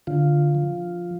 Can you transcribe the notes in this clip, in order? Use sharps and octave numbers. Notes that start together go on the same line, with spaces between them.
D3 F4
F3